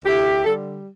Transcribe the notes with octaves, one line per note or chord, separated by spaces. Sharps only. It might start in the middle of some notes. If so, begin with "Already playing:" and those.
D2 E4 G4
D3 G3 A4